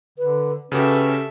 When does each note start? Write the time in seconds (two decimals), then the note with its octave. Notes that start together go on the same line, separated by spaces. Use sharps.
0.18 D3 B4
0.72 C#3 C#4 F#4 G4 A4 B4 E5